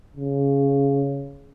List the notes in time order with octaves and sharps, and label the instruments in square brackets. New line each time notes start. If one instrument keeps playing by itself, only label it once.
[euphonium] C#3